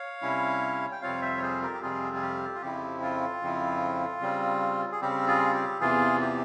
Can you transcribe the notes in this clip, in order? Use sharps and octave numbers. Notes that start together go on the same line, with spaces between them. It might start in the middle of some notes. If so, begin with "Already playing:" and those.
Already playing: C#5 F5
C3 G3 C#4 E4
G5
F2 C3 G3 C4 F4 C#5 F5
C5 E5
C#5
G#4 C5
G4 A#4
G4
F2 C3 G3 C4 F4 G#4
G#4
G4
F4
F2 C#3 F3 C4 E4 G4
F4
F2 C#3 F3 C4 E4
C#3 G3 C4
G#4
C#3 G3 C4 G4
F4 G#4
G4
E2 C3 E3 F4 G#4
G4